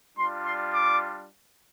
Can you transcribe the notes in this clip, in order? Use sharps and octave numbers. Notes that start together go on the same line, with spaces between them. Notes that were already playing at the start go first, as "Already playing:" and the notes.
G3 D4 F4 C6
C6
D6